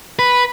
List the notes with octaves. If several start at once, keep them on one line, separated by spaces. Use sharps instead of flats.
B4